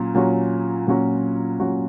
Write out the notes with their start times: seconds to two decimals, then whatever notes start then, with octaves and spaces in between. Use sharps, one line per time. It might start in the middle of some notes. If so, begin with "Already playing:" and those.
Already playing: A#2 F#3 C#4
0.15 A#2 F#3 C#4 F#4
0.87 A#2 F#3 C#4 F#4
1.60 A#2 F#3 C#4 F#4